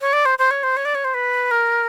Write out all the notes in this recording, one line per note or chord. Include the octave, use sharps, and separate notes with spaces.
C#5
D5
C5
C5
C#5
C5
C#5
D5
C#5
C5
B4
A#4